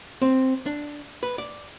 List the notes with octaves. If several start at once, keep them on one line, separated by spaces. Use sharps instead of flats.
C4
D4
B4
D5